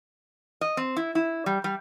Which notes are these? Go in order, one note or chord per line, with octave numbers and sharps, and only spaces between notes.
D#5
C4
E4
E4
G3
G3